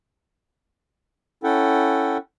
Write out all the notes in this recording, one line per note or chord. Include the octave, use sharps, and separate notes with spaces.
C#4 E4 A4 F#5 G5